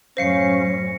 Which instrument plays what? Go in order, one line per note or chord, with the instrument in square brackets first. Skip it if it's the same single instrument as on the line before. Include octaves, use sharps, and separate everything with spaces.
[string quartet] F#2 A2 [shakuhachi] C#4 [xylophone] C5 F5 [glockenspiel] A#6 C7 C#7